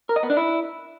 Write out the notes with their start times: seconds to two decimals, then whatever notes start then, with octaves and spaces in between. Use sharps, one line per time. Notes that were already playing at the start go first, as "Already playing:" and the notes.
0.09 A#4
0.16 D#5
0.23 B3
0.30 D4
0.37 E4